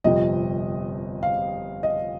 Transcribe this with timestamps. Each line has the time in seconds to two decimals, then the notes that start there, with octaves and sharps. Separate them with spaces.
0.04 G1 F2 C3 F3 D#5
1.23 F5
1.83 D#5